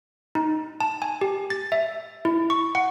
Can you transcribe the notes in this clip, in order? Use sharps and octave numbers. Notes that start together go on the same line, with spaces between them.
D#4
A5
G#5
G4
A6
E5
E4
C#6
F#5